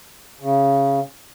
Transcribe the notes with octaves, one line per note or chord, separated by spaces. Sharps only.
C#3